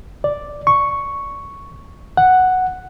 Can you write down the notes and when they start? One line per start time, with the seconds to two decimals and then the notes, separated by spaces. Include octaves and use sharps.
0.24 D5
0.67 C#6
2.17 F#5